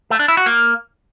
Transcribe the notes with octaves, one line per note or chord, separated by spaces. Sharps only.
A3
D4
E4
F#4
A#3